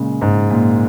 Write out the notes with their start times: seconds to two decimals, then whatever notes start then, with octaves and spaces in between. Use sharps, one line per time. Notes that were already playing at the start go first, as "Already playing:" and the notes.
Already playing: A#2 C#3 G#3
0.21 G#2
0.50 A#2